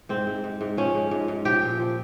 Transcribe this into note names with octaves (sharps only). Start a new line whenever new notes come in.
G#2 C4
G#2
G#2
G#2
F3 C#4
G#2
G#2
G#2
F3 G4
A#2
F3